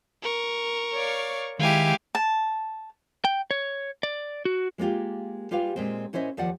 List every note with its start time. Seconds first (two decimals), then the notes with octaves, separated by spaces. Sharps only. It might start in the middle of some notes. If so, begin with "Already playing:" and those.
0.22 A#4 C#6
0.93 C#5 D5 F5
1.59 D#3 G#3 E4 G4 F5 G#5
2.15 A5
3.25 G5
3.51 C#5
4.03 D5
4.45 F#4
4.78 G#3 A#3 D4 F4 G4
5.51 G3 F4 G4 G#4 B4 F5
5.76 A#2 G#3 C4
6.13 A#2 C#4 E4 C5 D#5 E5
6.37 D#2 F3 G3 D5 F#5